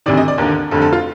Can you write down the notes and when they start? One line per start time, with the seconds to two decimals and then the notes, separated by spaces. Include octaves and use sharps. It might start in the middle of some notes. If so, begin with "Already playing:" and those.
0.06 D2 C3 D#3 D5
0.17 D#5
0.28 D5
0.38 D#2 D3 A#4
0.71 F1 F2 D3 A4
0.82 A4
0.93 F4